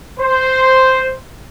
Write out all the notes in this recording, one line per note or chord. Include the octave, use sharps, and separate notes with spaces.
C5